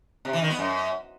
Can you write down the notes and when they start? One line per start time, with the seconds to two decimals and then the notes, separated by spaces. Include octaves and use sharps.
0.25 C3
0.33 E3
0.42 D#3
0.50 B3
0.59 F#2